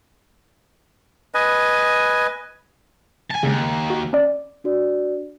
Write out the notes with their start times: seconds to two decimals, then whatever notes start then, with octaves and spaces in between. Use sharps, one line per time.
1.34 B4 D#5 G#5
3.31 G#5 A5
3.43 D#2 C#3 G#3
3.90 F#4
4.13 C#4 D5
4.64 D4 F#4 D5